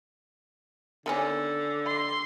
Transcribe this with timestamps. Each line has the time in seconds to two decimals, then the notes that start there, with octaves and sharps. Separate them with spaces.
1.06 D3 D#3 B3 C#4
1.87 C6